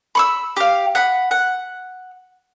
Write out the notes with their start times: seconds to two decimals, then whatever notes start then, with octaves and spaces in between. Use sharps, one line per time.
0.15 B5 C#6 E6
0.56 G4 F5
0.95 F#5 B5
1.31 F#5